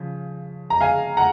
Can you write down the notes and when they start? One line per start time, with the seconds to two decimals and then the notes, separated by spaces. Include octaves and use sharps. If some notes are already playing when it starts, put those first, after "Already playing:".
Already playing: C#3 F3
0.70 A#5
0.81 F5 G#5
1.17 F#5 A#5